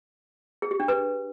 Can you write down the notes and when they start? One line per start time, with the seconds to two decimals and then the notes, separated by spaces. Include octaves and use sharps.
0.62 G#4
0.71 G4
0.80 D4
0.88 B4